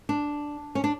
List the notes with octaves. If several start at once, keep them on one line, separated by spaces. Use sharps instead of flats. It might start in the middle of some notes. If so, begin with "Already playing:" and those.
D4
C#4
D4